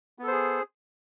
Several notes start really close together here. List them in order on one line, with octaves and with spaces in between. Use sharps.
B3 A4 C5 G#4